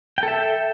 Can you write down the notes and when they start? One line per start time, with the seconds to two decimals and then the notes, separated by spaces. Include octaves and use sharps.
0.18 G5
0.23 A4
0.28 E5